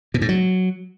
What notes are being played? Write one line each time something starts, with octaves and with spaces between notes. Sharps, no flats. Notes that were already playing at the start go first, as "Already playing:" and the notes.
B2
G#2
F#3